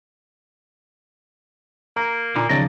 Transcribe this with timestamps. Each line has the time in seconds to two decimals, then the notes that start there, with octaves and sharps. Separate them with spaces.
1.96 A#3 A#5
2.36 A#2 D3 D#4
2.49 D#2 C#3 F3 F#3 D5 D#5